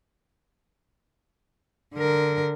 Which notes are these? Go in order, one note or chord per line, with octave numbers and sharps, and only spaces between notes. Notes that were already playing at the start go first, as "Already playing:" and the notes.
D3 A#4